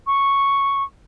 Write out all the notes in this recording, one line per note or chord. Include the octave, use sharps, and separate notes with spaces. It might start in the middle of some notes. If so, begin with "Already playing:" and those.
C#6